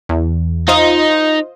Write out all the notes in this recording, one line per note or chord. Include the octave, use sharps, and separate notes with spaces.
E2
D#4 F4 C5 D#5